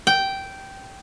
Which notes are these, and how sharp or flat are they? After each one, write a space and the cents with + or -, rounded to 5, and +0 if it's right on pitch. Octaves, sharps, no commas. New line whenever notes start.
G5 -10